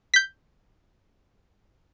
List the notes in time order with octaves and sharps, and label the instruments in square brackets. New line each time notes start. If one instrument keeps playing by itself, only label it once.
[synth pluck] G6 B6